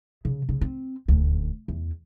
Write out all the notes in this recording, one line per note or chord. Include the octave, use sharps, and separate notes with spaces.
C#3
C#3
C4
D#1 D2
E2